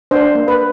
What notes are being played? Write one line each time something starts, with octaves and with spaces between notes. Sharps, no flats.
D4 C5
A#3
B4